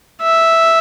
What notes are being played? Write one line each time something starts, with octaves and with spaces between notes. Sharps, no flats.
E5